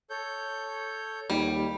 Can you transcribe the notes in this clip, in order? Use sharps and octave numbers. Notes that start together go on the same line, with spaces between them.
A4 C#5 G6
D#2 G3